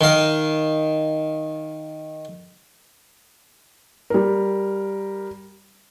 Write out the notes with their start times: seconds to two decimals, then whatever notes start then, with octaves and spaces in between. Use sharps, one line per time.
0.01 D#3 F5
4.10 G3 A#4